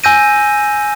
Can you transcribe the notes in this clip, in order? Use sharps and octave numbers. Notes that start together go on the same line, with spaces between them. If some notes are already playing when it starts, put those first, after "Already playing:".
G#5 E6 G6 A#6 D#7